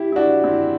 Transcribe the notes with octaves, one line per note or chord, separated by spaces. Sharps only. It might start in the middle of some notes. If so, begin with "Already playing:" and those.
Already playing: E4 G4
E4
D4 F#4
C4 E4